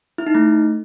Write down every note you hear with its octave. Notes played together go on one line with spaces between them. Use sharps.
E4
D#4
A3